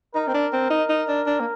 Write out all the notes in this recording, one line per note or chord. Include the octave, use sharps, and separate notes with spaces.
D#4 A#4
C4
D4
C4
D#4
D#4
D4
D4
A#3